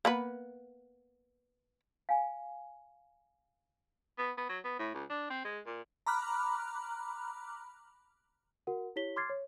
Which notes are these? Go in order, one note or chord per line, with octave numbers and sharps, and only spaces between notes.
A#3 B3 B4
F5 G#5
B3
B3
F#3
B3
A2
C#2
D4
C4
G#3
A#2
A#5 B5 D6 F6 F#6
F#4 A#4 F#5
E4 G4 C#5 B6 G7
C6 D6 F6 G#6 A6 C7
C#5